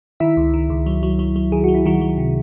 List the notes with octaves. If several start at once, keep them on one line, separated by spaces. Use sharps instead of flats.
D#3 E4 E5
C#2
D#3
C#2
F#3
F#3
F#3
F#3
D#3 G#4
F#3 F#4
E4
D#3 F#3 F#4
F#3
C3